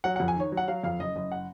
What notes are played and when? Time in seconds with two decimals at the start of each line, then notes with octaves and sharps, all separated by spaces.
0.04 F#3 F#5
0.16 F2 F#5
0.28 G#5
0.36 D#3 C#5
0.52 F#3
0.57 F#5
0.68 F#3 F5
0.84 F2 F5
1.00 F#1 D#5
1.16 F#1 D#5
1.32 F#5